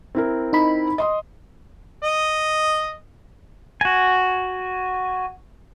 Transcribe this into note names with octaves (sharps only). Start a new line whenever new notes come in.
C4 E4 A#4
D#4 B5
D#5 C6 D#6
D#5
F#4 G#5